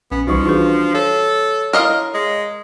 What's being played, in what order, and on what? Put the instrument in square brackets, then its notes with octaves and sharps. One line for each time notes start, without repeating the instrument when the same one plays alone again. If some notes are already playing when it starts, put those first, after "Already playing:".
[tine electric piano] A#1 [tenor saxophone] B3 [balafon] C#4
[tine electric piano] C2 D#4 C#6 [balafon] E3 G3 F#4 [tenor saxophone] F3
[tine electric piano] D4 F#4 [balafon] F4 G#4 B4
[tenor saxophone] A4 [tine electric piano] C#5
[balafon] E4 C6 D6 [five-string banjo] A#4 D#5 F5
[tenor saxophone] G#3